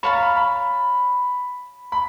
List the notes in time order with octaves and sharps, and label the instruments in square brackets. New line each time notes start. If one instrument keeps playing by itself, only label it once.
[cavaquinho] C#5 F5 A5 [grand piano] B5
[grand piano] A#5
B5
B5
B5